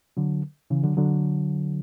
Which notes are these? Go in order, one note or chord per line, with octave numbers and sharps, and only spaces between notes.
D3 F#3
C#3 E3
D3 F#3
D3 F#3